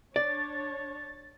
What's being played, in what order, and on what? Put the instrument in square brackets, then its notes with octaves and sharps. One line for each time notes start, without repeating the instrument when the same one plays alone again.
[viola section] D4 C#5 [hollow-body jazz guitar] D5 [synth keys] A6